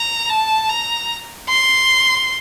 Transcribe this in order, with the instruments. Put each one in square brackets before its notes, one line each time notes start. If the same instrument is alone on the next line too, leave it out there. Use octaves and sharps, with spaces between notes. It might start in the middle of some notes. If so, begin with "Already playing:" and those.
Already playing: [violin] A#5
A5
A#5
C6